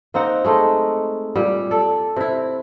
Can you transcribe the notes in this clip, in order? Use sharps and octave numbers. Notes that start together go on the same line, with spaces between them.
A#3 C4 D#4 F#5
G#3 A3 D#4
A#2 G3
A4 D5
C3 E4